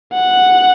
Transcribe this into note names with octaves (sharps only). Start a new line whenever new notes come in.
F#5